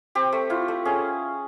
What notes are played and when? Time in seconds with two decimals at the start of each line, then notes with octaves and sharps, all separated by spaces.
0.15 C4 G4
0.32 A3
0.50 E4 F4
0.68 A3
0.85 C#4 G#4